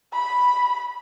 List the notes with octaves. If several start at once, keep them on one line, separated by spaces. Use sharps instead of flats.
B5